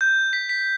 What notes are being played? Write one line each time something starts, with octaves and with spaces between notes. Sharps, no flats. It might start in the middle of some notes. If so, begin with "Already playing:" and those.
G6
B6
B6